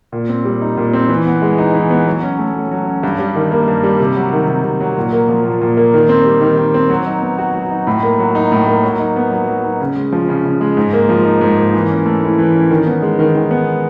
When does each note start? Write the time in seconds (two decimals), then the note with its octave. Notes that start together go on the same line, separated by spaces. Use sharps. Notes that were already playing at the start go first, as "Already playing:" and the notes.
0.12 A#2
0.29 C4
0.45 G3
0.61 D#4
0.77 A#2
0.93 C4
1.09 E3
1.26 B3
1.42 G#3
1.58 D#4
1.74 E3
1.90 B3
2.06 F#3
2.23 C#4
2.39 A3
2.55 F#3
2.72 F#3
2.87 C#4
3.03 G2
3.19 G3
3.35 D#3
3.52 A#3
3.68 G2
3.83 G3
4.00 C3
4.16 F#3
4.33 D#3
4.48 C3
4.64 C3
4.81 F#3
4.97 A#2
5.13 A#3
5.29 F3
5.45 A#2
5.61 A#2
5.77 A#3
5.94 D#3
6.09 C4
6.25 G3
6.41 D#3
6.57 D#3
6.74 C4
6.90 F#3
7.06 D#4
7.22 B3
7.38 F#4
7.55 F#3
7.71 D#4
7.87 A2
8.03 A#3
8.19 F#3
8.35 D#4
8.52 A2
8.67 A#3
8.84 F#3
8.99 D#4
9.16 B3
9.32 F#3
9.48 F#3
9.64 D#4
9.81 C#3
9.96 G#3
10.12 F3
10.29 C#3
10.45 C#3
10.61 G#3
10.77 G#2
10.93 A#3
11.09 F3
11.25 D#4
11.41 G#2
11.57 A#3
11.73 E3
11.90 C#4
12.06 A3
12.23 E4
12.38 E3
12.54 C#4
12.71 D#3
12.86 B3
13.02 G#3
13.19 D#3
13.35 D#3
13.51 B3